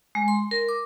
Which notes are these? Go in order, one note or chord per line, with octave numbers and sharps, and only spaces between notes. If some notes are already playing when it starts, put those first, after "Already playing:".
G#3
C6
A#4
D6